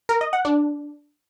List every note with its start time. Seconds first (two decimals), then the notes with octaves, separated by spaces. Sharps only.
0.09 A#4
0.21 D#5
0.33 F#5
0.45 D4